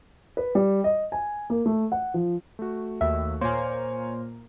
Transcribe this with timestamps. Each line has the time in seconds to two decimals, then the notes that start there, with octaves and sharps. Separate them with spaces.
0.37 B4
0.55 G3
0.84 D#5
1.12 G#5
1.50 A#3
1.66 A3
1.92 F#5
2.14 F3
2.59 A3 F#4
3.01 D#2 E5
3.41 A#2 A#3 C5 C#5 G#5